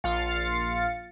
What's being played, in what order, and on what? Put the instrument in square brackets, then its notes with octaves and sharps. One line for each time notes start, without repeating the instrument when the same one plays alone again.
[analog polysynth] A#1 F4 F5 A6 C#7